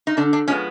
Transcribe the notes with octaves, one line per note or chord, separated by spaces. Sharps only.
D#4
D3 D4
D4
F3 G#3 B3 C#4